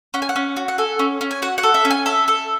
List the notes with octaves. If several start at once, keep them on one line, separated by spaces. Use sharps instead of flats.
C#4 F#5
G#5
F#5
C#4
F#4
F#5
A4 G#5
C#4
C#4
G#5
F#4 F#5
F#5
A4
E5
C#4
G#5
A4 E5
A4